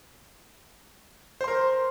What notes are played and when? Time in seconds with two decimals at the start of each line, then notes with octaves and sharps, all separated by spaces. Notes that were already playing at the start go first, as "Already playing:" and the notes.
1.41 C5
1.44 C6
1.48 A#4